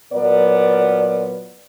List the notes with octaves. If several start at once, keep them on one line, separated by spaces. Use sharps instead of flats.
A#2 F#3 B3 A#4 D5